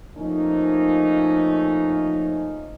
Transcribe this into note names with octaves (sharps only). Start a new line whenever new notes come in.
F3 A3 A#3 C#4 D#4